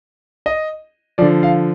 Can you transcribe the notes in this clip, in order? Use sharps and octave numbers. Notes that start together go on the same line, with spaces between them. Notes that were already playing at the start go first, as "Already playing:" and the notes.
D#5
D3 F3 D5
F5